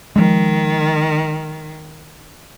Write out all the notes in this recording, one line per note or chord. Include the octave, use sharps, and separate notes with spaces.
D#3 F3 G#3